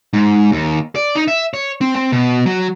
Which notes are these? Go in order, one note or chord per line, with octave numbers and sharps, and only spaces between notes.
G#2
D#2
D5
D#4
E5
C#5
C4
C4
B2
F#3